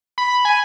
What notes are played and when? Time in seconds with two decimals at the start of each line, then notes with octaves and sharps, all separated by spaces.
0.18 B5
0.45 G#5